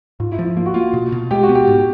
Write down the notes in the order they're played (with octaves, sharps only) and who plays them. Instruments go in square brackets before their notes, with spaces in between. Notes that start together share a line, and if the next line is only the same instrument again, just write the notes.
[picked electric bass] G#2 [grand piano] F4
[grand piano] E4
[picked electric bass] F3
[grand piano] E4
[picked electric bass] A#3 [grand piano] F4
[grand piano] F#4
[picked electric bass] A#3 [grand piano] F4
[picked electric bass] B2
B2
[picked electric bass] G#3 [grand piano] G4
[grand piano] F#4
[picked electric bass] B3
[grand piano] G4
[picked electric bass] G#2